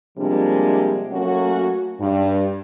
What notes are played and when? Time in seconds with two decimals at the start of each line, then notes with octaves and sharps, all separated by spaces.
0.18 C3 F3 G3 G#3 A#3 D4
1.11 F#3 A3 A#3 C#4 F#4
2.00 G2